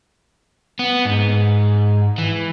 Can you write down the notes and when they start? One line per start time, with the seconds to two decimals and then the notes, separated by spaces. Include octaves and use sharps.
0.79 B3
1.05 G#2
2.18 E3